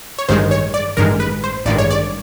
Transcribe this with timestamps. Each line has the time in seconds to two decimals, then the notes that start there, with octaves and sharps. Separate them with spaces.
0.18 C#5
0.29 A1 G2 D#3 G#3 C5
0.51 C#5
0.74 D5
0.97 A1 G2 D#3 G#3 A#4
1.20 B4
1.44 C5
1.65 A1 G2 D#3 G#3 D5
1.78 C#5
1.90 D5